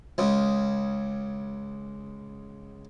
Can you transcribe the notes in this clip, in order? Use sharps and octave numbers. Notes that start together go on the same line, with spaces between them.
C#2 C#3